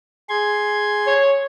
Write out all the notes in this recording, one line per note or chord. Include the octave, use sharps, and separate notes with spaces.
G#4 C6 G#6
C#5